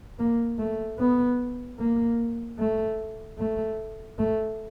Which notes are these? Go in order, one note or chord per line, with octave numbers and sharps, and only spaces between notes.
A#3
A3
B3
A#3
A3
A3
A3